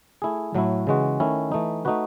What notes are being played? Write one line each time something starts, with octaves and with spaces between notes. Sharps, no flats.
A3 E4 G#4
A2 F#3 A3 E4
C#3 E3 G#3 D#4 F#4
D#3 A3 C#4 E4
E3 A3 D#4
A3 D#4 F#4 B4